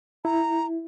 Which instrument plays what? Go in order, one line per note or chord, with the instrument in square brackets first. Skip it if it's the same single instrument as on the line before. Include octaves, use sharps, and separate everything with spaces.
[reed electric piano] E4 [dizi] A#5